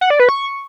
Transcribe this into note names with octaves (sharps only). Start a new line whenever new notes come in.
F#5
D5
B4
C#6